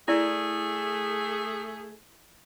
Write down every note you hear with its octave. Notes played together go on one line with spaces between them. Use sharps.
A3 E4 G#4 D5